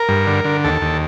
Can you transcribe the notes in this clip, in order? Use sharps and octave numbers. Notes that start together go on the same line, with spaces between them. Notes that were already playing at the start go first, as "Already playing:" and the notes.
Already playing: A#4
G2
D3
D3
D#2 A4
D#2